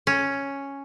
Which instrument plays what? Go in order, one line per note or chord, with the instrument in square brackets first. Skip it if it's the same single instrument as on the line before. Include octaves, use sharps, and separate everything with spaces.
[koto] C#4